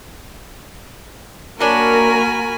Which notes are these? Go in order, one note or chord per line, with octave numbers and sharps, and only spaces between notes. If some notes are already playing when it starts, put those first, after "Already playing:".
F#3 A#3 D4 F#4 A#4 G#5 B5